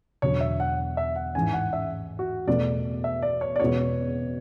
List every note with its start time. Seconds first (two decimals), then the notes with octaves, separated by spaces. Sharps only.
0.22 E1 E2 D3 F#3 C#5
0.41 E5
0.60 F#5
0.97 E5
1.16 F#5
1.35 A1 G#2 E3 G#5
1.53 F#5
1.73 E5
2.19 F#4
2.47 E2 B2 A3 D5
3.04 E5
3.22 D5
3.41 C#5
3.56 D5
3.60 E2 B2 G#3 B3 F#4 C#5